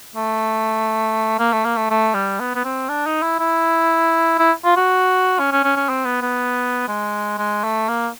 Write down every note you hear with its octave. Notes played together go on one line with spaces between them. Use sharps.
A3
A#3
A3
A#3
A3
A3
G3
B3
B3
C4
D4
D#4
E4
E4
E4
F4
F#4
C#4
C#4
C#4
C#4
C4
B3
B3
G#3
G#3
A3
A#3